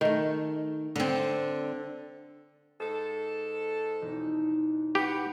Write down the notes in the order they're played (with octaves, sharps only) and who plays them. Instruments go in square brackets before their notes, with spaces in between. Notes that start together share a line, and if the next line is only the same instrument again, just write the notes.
[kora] D#3 A3
[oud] D3 C4
[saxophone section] G#2 A4
[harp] E1 D#4
[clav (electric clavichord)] G4 [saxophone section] B4 F#5